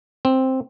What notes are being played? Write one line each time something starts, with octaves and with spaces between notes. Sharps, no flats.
C4